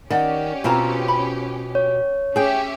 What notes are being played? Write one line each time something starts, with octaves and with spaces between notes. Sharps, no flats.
D#3 C#4 G4 D5 D#5 F#5
B2 C4 E4 F4 A#5
B5
C#5
C#4 G4 G#4 E5 G5